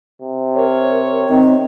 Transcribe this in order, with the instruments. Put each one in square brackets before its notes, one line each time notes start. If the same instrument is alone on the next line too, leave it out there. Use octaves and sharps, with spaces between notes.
[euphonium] C3
[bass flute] A#4 [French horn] C#5
[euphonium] D#3 [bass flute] C4